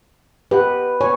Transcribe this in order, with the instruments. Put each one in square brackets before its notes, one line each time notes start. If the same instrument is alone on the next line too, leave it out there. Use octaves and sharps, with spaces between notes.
[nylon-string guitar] G4 D#5 F#5 [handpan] B4
[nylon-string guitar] B3 G#5 [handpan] C#5